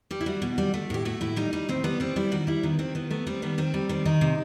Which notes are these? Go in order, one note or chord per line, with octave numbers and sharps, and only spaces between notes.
G3 G4
E4
G3 F#4
B2
G3
A3
A2 G4
A3 F#4
A2 E4
G3 D#4
G3 D#4
A2 C4
G3 B3
G3 C4
G3 E4
D#3 F#4
G3 E4
D#3 B3
D#3 C4
D#3 B3
A3 B3
G3 C4
D#3 B3
D#3 C4
G3
D#3 C4
D#3 D#4
C3